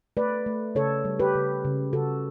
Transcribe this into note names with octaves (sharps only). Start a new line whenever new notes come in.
A3 B4 D5
A3
C#3 A4 C#5
G3
G4 B4
C#3
C#3
C#3 F#4 A4